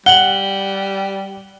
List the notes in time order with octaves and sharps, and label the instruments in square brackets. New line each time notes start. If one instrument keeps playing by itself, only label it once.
[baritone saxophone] G3 [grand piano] F#5 [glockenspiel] F#7 G7